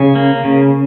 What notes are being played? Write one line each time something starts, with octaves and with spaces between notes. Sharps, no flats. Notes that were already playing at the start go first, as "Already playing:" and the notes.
Already playing: C#3 G#5
A#3
C#3